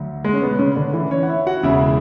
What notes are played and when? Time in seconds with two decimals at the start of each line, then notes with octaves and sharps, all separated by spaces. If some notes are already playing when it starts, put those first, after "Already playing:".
Already playing: D2 D3 F#3
0.25 G#3
0.33 C#4
0.42 B2 B3
0.59 C#3 C#4
0.76 D3 D4
0.93 E3 E4
1.11 C#4 C#5
1.23 F#5
1.28 E4 E5
1.47 F#4 F#5
1.63 E1 E2 C#3 E4 E5